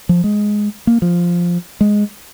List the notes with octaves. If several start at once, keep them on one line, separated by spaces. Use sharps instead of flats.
F3
G#3
A#3
F3
G#3